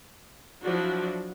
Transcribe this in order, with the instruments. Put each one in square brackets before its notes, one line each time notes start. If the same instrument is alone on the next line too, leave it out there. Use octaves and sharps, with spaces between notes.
[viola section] F3 F#3 D4 E4 F#4